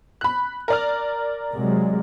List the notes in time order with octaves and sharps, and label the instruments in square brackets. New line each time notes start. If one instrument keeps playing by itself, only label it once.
[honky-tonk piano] B5 F#6
A#4 D5 F6
[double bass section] C3 F#3 G#3